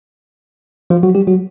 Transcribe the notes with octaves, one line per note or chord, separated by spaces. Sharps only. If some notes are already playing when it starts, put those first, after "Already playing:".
F3 F4
F#3 F#4
G3 G4
F#3 F#4